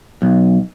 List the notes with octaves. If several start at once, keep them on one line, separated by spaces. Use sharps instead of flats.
B1